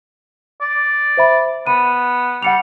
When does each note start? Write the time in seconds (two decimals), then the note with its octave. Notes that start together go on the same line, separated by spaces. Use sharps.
0.61 D5
1.17 C5 E5 B5
1.67 B3 B5 D#7
2.42 G3 F#5 C#7 F7